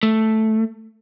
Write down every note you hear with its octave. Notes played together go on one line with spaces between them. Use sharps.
A3